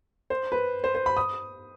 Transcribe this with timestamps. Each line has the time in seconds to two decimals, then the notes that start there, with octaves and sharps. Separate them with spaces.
0.30 C5
0.52 B4
0.84 C5
0.95 C5
1.06 B5
1.17 D#6